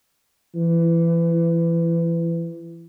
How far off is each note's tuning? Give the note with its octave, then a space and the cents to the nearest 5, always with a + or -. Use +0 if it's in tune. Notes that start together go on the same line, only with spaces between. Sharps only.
E3 +25